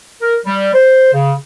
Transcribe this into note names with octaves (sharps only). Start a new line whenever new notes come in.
A#4
G3
C5
C#3